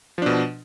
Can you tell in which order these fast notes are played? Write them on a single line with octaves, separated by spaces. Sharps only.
F3 D4 B2